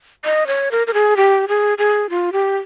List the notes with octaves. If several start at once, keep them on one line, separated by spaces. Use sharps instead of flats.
D#5
C#5
A#4
A#4
G#4
G4
G#4
G#4
F4
G4